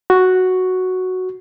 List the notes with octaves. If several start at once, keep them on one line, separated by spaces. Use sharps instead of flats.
F#4